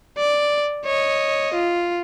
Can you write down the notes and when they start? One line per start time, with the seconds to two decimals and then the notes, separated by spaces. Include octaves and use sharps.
0.18 D5
0.85 C#5 D#5
1.54 F4